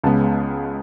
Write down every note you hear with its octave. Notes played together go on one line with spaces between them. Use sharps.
C#2 C#3 G#3 B3 A5